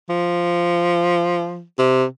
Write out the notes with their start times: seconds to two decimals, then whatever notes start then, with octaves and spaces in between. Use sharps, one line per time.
0.09 F3
1.79 C3